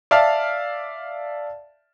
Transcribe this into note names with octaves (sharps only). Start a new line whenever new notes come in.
D5 E5 F5 A5 F6